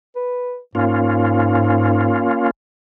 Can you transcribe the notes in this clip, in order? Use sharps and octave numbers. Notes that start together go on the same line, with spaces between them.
B4
G#2 A#3 C#4 F4